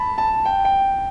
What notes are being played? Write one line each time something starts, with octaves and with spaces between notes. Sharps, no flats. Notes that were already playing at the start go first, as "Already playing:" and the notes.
Already playing: A5 B5
A5
G5
G5